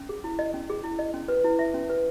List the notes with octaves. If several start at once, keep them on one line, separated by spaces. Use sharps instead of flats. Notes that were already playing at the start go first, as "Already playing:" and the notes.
Already playing: C#4
G#4
E4
D#5
C#4
G#4
E4
D#5
C#4
B4
E4
E5
C#4
B4